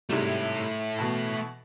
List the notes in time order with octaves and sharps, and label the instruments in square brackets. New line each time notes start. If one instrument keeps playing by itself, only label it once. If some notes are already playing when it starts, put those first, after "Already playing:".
[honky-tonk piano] G#2 C3 G3 [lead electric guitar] A3 E4
[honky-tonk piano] B2 E3 A5